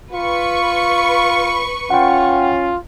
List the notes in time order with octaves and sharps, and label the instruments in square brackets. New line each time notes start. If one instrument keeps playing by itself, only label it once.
[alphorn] F4 [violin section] B4 C#6
[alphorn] C#4 [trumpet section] F4 [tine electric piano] F#5 G5